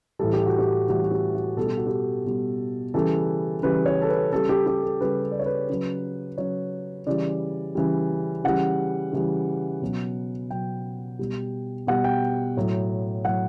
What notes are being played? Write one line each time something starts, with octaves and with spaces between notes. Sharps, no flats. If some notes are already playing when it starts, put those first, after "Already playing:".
A2 E3 G3 A4
G4
F#4
G4
A2 E3 G3 F#4
F#4
G4
F#4
B2 G3 A4
G4
F#4
G4
B2 G3
C#3 E3 G3 A4
C#3 E3 G3 B4
C#5
A4
B4
C#3 G3 A4
G4
G4
A4
C#3 G3 B4
D5
C#5
B4
C#3 F#3
C#3 F#3 C#5
C#3 E3 G3 D5
C#3 E3 G3
C#3 E3 G3 F#5
C#3 E3 G3
B2 F#3
B2 F#3 G5
B2 G3
B2 G3 F#5
G5
A2 F#3
A2 F#3 F#5